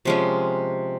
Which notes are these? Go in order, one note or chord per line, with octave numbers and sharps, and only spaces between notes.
C3 F3 G#3 C#4